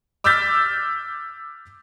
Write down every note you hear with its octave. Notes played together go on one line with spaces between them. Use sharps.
D6 E6 F6 G6 A6 B6